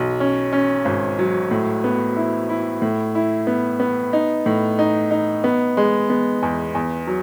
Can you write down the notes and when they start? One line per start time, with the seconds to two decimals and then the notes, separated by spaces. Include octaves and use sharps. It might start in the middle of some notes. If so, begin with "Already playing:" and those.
Already playing: B1
0.20 C#4
0.53 C#4
0.85 G#1
1.19 F#3
1.51 A2
1.84 B3
2.16 E4
2.49 E4
2.82 A2
3.15 E4
3.47 B3
3.80 B3
4.13 D#4
4.46 A2
4.79 D#4
5.11 D#4
5.44 B3
5.77 G#3
6.09 B3
6.43 E2
6.75 E2
7.07 F#3